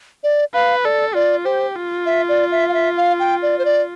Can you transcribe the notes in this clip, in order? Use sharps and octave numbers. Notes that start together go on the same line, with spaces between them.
D5
B4 F5
A4 D5
F4 D5
G4 C5
F4
E5
D5
E5
F5
E5
F5
G5
D5
C5
D5